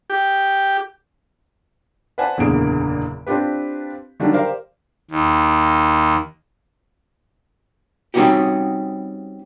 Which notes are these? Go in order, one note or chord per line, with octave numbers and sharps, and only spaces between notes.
G4
B4 C5 D5 F#5 G#5 A5
F#1 E2 A#2 D3 G#4 D7
C4 D4 F4 G4 B4
D3 D#3 F#3 G3 D4 F4
G4 A#4 C5 D5 F5
D#2
G3 C4 C#4 D#4 F#4 G4